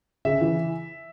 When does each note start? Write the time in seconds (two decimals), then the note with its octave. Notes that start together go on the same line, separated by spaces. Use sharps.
0.25 C#3 E5
0.41 E3